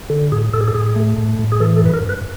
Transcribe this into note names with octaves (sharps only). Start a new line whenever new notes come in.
D3
A2 G#4
A2 A4
G#4
A4
A2 G#4
A3
A2
A2
G#4
E3 A4
A4
G2 B4
A#4
G2
B4